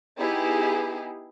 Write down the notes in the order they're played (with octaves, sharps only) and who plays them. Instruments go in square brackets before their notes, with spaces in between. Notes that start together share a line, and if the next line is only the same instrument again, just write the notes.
[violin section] B3 D#4 E4 G4 G#4